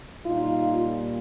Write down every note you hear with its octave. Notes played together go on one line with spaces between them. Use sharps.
A#2 G3 D#4 F4